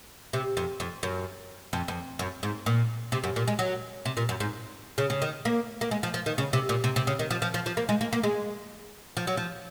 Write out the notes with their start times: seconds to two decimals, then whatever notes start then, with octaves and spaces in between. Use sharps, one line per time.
0.33 C3
0.57 F2
0.80 F2
1.03 F#2
1.73 F2
1.88 F2
2.19 F#2
2.43 G#2
2.66 A#2
3.12 C3
3.24 F#2
3.36 A#2
3.48 G#3
3.59 F#3
4.05 C3
4.17 A#2
4.29 F#2
4.40 G#2
4.98 C#3
5.10 C#3
5.22 D#3
5.45 A#3
5.81 A#3
5.91 G#3
6.03 F3
6.14 F3
6.26 D#3
6.38 C#3
6.53 C3
6.69 A#2
6.84 C3
6.96 C3
7.07 C#3
7.19 D#3
7.31 F3
7.42 F3
7.54 F3
7.66 F3
7.77 A#3
7.89 G#3
8.01 A#3
8.13 A#3
8.23 G#3
9.17 F3
9.27 F#3
9.37 F3